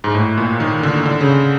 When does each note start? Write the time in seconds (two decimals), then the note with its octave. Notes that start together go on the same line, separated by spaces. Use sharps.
0.04 G#2
0.15 A2
0.38 A#2
0.60 D#3
0.83 D3
1.06 D3
1.21 C#3